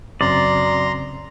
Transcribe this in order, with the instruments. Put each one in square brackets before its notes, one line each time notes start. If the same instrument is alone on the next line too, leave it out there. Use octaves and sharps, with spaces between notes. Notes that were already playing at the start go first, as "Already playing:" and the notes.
[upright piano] F#2 [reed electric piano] C#3 C4 C#4 [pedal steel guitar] D5 [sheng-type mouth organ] A#5 C6